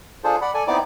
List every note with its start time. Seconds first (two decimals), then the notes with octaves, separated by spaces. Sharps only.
0.24 D4 F4 G#4 A4 C5
0.42 D5 F#5 B5
0.54 A4 D5 G#5
0.67 B3 C4 D#4 E4 D5 D6